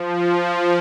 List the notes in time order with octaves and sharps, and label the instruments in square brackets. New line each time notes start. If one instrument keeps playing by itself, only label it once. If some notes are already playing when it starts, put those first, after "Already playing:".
Already playing: [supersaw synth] F3